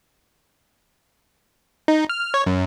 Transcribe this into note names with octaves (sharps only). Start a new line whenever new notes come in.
D#4
F6
F6
C#5
F#2